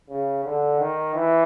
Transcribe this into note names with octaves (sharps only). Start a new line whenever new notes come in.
C#3
D3
D#3
E3